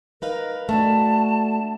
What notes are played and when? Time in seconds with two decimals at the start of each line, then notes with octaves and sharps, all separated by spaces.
0.22 D#4 A#4 B4 F5
0.69 A3 D4 F#4 A5